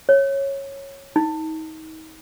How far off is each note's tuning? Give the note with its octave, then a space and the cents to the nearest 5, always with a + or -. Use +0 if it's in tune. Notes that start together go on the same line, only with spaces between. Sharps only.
C#5 -15
D#4 +30